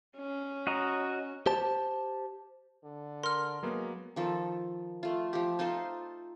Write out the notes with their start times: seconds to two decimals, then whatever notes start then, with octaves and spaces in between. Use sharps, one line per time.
0.17 C#4
0.67 F#4 D#5 A#5
1.46 G4 C5 A5
2.84 D3
3.23 A#4 C6 F6
3.63 F#3 G#3 A#3 B3
4.16 D#3 F3 A4
5.03 A3 F4
5.33 F3 G4
5.59 D#4 F4 A4 C5